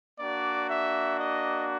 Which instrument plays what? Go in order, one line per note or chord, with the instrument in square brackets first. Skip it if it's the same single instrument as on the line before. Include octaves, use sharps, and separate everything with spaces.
[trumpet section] A#3 D4 F#4 D5
E5
D#5